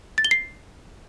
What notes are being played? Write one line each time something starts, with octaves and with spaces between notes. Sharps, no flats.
A6
G7
C7